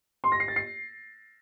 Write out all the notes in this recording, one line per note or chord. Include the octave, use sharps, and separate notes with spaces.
C6
A#6
C7
A6
C7